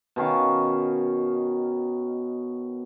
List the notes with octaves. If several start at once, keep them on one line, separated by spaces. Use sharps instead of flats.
B2 D#3 C#4 F5